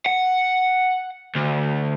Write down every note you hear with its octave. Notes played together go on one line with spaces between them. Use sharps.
F#5
D2